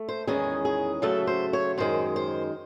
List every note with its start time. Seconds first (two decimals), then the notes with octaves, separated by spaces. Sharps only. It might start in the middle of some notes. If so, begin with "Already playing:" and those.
Already playing: A3
0.09 C5
0.27 E2 D#3 G#3 C#4 G#4
0.65 G#4
1.02 C#3 F#3 A3 A4
1.27 C5
1.53 C#5
1.78 F#2 D#3 G#3 C5
2.16 C5